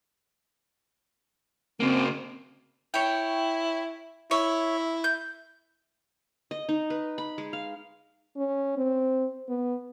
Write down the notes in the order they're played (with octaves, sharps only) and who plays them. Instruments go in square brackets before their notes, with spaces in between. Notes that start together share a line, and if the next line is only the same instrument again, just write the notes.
[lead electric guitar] C#3 A#3 [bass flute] C4
[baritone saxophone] E4 [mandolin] C#5 G5
[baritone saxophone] E4 [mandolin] C#5 E5
[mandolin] G6
[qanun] D#5
D#4
B4
B5
G#3
F5
[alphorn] C#4
C4
B3